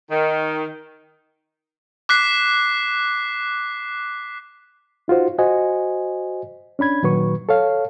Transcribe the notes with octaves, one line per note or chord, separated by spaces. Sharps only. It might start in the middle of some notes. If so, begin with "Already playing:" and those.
D#3
D6 F#6 B6 C7
D#4 F4 F#4 C5
F#4 C5 D#5 G#5
C#4 D4 B5 G#6
A#2 D#3 F#3 B4 C#6
A4 C#5 F5